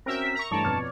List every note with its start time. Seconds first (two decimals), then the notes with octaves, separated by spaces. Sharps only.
0.06 C4 C#4 F#4 A#4 E5 G5 A#6
0.21 B6
0.35 A#5 C#6
0.51 G2 E3 G3 A3 C#5 D5 A5
0.65 F2 B2 F6